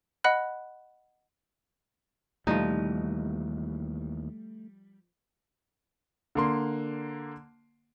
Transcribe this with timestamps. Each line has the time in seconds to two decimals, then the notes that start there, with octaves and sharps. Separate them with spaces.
0.24 D#5 F#5 B5 F#6
2.47 D#2 B2 E3 F3 G3 A3 D#4
6.35 D3 A#3 C6